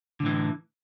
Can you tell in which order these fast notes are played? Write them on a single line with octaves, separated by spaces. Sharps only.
D3 A2 E3